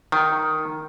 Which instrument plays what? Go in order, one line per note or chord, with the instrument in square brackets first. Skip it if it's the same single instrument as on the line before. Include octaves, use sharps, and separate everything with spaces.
[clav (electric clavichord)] D#3